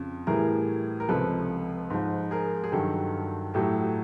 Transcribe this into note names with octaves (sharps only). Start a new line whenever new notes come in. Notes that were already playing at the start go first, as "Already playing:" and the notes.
Already playing: F2 C#3
A2 E3 G3 G#4 A#4
A#4
C#2 C3 F3 A4 B4
G#2 F3
G#4 A#4
G#4
G2 D#3 F#3 G4 A4
A2 F#3 G4 A4